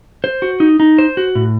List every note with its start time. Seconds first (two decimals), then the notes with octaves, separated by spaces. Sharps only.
0.24 C5
0.42 F#4
0.60 D#4
0.80 D#4
0.98 C5
1.17 F#4
1.35 A2